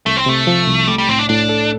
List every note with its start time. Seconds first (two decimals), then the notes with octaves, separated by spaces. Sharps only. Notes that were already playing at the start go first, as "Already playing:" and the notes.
0.06 C2 A3
0.17 C4
0.26 C3 A3
0.47 F3
0.68 C2
0.88 G3 A3
0.98 G3
1.09 A2 C4
1.19 D4
1.29 A2 D4
1.49 A4